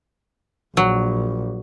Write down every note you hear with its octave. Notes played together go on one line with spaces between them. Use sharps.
A#1 F#3